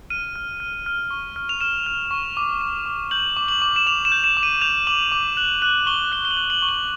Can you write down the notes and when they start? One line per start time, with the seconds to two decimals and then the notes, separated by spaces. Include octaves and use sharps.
0.10 F6 D#7
0.36 F6
0.60 F6
0.86 F6
1.11 C#6
1.36 F6
1.49 F7
1.61 F6 E7
1.86 F6
2.11 C#6
2.37 D6
2.61 D6
2.86 D6
3.11 G6 F#7
3.37 D6
3.48 F#7
3.62 D6
3.76 E7
3.86 D6 F7
4.05 E7
4.12 G6
4.24 E7
4.37 D6
4.43 D#7
4.61 G6 F7
4.87 D6 F#7
5.12 D6
5.37 F#6 F#7
5.62 F#6 F#7
5.86 C#6 G7
6.12 F#6 G7
6.25 G7
6.31 F#7
6.37 F#6
6.50 F#7
6.62 C#6
6.69 G7